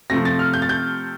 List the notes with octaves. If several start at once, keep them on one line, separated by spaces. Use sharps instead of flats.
C3 F3 A3 C4 A#6
A6
F6
G6
A6
G6